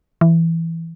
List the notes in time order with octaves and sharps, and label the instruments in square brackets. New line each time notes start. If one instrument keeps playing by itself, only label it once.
[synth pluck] E3